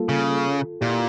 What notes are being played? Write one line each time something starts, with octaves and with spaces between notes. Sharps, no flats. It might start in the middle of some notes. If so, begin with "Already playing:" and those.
Already playing: G3 A#3 F4 A4
C#3
A#2 E4 G4